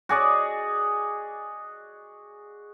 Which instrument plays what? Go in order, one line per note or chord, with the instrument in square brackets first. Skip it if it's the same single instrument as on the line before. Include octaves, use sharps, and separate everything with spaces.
[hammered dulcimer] F#4 G#4 D5 D#5